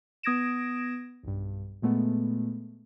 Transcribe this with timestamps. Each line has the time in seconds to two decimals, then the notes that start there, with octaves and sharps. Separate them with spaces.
0.23 B3 D#6 G#6 A#6 D7 E7
1.23 B1 G2
1.82 A#2 G#3 A3 B3